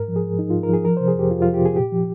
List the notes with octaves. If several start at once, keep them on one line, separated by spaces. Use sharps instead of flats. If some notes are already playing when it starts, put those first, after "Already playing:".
Already playing: G#2 A#4
F3
G#4
G#2
F3 D#4
G#2 F4
A#4
F3 G#4
F3 A#4
C3 C5
G#4
F2 G4
F2 F4
F3 F4
G4
C3 G#4
A#2 G4
F3